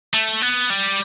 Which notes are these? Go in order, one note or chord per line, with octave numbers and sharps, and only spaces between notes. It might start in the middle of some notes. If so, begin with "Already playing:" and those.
A3
B3
G3